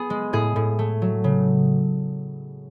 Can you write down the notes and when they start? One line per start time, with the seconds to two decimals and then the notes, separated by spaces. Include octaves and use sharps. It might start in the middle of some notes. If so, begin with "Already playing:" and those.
Already playing: B3 G#4
0.10 G#3
0.33 A2 G#4
0.56 A2
0.79 A3
1.02 F#3
1.24 C#3